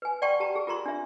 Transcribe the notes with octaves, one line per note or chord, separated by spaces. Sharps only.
B4 G#5
D5 F#5 G5 A5 C6 C#6
G4 A5 A#5
G#4
F4 A#4 A#5 C6
D4 E5